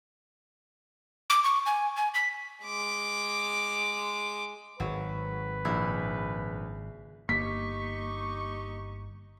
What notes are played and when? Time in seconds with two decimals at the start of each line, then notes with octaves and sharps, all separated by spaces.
1.30 D6
1.44 C#6
1.66 G#5
1.96 G#5
2.14 B6
2.65 G#3 D6
4.80 G#1 F#3 B4
5.65 A#1 C#3 E4
7.29 G1 A#3 D#4 G4 C#6 B6